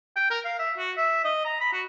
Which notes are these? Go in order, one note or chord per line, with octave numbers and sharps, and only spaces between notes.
G5
A#4
F5
E5
F#4
E5
D#5
A#5
B5
F#4